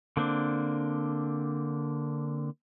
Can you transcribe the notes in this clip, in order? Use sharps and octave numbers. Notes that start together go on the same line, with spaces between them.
D3 A#3 C4 D4